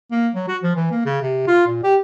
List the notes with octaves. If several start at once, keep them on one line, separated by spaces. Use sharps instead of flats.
A#3
F#3
F#4
F3
E3
A#3
C#3
C3
F4
A#2
G4